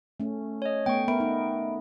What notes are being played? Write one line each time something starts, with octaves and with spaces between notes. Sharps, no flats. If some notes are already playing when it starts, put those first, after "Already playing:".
A3 C#4
C#5 D#5
A3 B3 G5 C#6
B3 A#4 E5 B5 D7
D#4